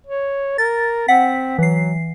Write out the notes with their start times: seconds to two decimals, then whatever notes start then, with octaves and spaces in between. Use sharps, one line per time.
0.07 C#5
0.58 A#4 A6
1.08 C4 F#5 B6
1.59 E3 F#3 C7